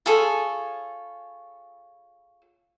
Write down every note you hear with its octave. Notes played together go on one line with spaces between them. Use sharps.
F4 G#4 A4 C#5